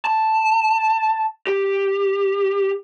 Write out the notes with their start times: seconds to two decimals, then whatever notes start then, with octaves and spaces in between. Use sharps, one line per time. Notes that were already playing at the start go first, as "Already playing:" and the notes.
0.05 A5
1.47 G4